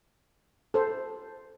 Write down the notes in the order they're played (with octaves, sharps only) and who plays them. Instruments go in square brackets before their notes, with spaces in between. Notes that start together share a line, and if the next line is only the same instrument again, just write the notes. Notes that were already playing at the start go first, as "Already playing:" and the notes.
[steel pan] A4 C5